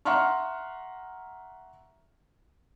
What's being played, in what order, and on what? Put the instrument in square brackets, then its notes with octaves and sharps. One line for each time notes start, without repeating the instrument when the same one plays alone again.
[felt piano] E5 F#5 A#5 C6 C#6 F6